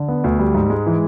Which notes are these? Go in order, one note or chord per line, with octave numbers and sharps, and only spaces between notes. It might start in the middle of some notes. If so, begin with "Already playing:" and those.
Already playing: D3
B3
D2
G3
G#2
G#3
E3